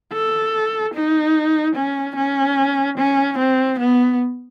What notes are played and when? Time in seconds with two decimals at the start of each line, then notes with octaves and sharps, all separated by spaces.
0.13 A4
0.95 D#4
1.76 C#4
2.16 C#4
2.98 C#4
3.39 C4
3.80 B3